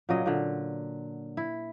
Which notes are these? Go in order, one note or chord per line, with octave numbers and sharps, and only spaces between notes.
A#2 C#3 F#3 D#5
A#2 D3
E4